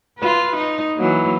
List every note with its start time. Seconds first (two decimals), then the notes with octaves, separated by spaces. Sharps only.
0.19 F4 B4
0.57 D#4
0.96 E3 F#3 A#3